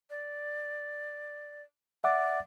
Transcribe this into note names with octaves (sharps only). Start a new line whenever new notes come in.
D5
D5 E5 F#5 D6